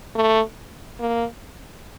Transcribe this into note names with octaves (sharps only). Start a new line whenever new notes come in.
A3
A#3